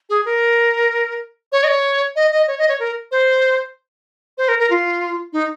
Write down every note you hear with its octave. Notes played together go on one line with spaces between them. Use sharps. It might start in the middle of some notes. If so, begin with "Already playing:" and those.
G#4
A#4
C#5
D#5
C#5
D#5
D#5
C#5
D#5
C#5
A#4
C5
C5
A#4
A#4
F4
D#4